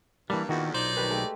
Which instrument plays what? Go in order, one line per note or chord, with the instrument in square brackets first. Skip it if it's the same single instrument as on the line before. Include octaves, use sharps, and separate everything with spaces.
[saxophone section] G2 [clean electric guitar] E3 G3 [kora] A#3 D4
[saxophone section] E2 [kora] A#2 [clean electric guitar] D#3 F#4
[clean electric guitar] B1 C5 [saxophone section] A#3 D#4 D5
[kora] G2 D#3 B4
G#3 A3 G4